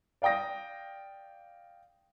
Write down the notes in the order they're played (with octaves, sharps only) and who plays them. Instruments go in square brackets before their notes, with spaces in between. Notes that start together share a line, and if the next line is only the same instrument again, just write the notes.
[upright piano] D5 F5 G5 D#6 A#6